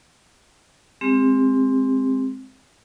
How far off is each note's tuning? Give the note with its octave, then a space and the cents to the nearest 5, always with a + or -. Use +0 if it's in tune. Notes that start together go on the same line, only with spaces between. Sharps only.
G#3 +0 C4 +0 G4 +35